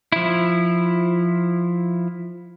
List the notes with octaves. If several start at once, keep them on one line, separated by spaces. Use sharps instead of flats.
F3 E4